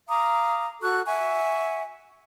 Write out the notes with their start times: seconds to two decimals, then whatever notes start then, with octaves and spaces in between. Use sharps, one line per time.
0.08 F5 A#5 D6 D#6
0.82 F#4 A4 C#6 F#6
1.07 E5 F#5 G#5 C#6